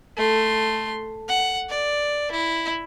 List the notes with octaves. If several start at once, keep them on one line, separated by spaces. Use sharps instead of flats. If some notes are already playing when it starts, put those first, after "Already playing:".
A3 C6
F#5
D5
E4